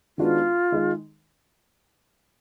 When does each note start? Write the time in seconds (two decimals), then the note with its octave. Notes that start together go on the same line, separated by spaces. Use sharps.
0.18 D#3 G#3 B3 D4 F4 F#4
0.72 D#3 G#3 D#4